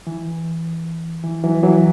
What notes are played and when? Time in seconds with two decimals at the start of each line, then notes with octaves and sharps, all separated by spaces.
0.07 E3
1.23 E3
1.44 E3 F#3
1.63 E3 F#3